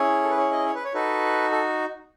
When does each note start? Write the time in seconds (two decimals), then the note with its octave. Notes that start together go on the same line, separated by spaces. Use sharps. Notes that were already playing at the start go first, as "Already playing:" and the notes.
Already playing: C#4 E4 G#4 C#5
0.23 A4
0.30 B4
0.37 C#5
0.52 D#5
0.66 C#5
0.75 B4
0.85 C#5
0.94 D#4 F#4 A4 B4
1.51 A4